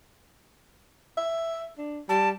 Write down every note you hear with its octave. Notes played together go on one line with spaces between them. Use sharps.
E5
D4
G3 A5